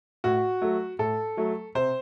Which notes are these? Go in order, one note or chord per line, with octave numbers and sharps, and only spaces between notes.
A2 F#4
F#3 A3
A2 A4
F#3 A3
C3 C5